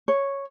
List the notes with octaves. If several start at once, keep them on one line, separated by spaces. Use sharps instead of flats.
C#5